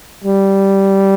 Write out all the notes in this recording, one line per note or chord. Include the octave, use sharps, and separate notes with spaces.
G3